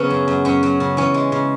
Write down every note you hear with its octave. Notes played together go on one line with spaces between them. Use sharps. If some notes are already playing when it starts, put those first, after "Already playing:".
Already playing: C#3 F#3 B3 C#4
F#2
F#2
F#2 C#4
F#3
C#3
E3 C#4
G#3
C#3